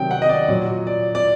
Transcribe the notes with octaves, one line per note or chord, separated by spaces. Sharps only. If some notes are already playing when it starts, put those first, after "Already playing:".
Already playing: C3 D#3 F#3 G5
F#5
D#5
D5
A#2 F#3
D5
D5